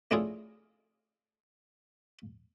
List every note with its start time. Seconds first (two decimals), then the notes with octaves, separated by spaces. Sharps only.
0.11 A3 C#4 D4 E4 F4 G#4